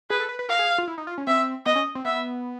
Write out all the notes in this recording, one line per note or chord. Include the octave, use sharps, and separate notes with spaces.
G#4 B4
A4
B4
B4
A#4 F5
G#4
F4
E4
D#4
F4
C#4
C4 E5
B3 D#5
C#4
C4
B3 E5